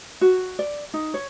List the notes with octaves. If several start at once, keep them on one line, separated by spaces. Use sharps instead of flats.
F#4
D5
D#4
C#5